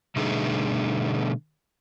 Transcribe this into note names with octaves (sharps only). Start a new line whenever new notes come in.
B2 D3 G3 A3 D#4 G#4